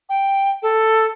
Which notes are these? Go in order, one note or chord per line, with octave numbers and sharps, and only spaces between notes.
G5
A4